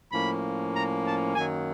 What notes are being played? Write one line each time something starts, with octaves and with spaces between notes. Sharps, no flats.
A2 F3 A#3 C#4 B5
A#5
A5
F#2 D#3 F#3 A#3 G#5